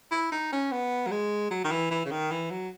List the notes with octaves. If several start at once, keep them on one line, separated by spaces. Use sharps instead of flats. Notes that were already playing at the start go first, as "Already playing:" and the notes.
E4
D#4
C#4
B3
F#3
G#3
F#3
D#3
E3
E3
C#3
D#3
E3
F#3